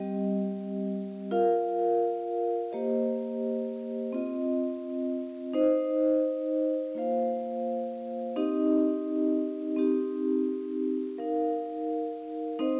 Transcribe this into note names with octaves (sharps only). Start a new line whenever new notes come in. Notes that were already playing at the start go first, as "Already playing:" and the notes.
Already playing: G3 C4 G4 D#5
F4 A#4 F5
A#3 G4 C5 D#5
C4 F4 D#5
D#4 C5 D#5
A#3 F4 C5 F5
C4 D#4 G4 D#5
C4 D#4 G4
D#4 A#4 F5
C4 D#4 C5 D#5